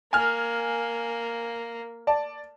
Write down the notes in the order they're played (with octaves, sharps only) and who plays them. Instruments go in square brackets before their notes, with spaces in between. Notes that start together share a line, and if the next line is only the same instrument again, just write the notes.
[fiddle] A#3 [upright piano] G#5 F6
[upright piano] D5 A5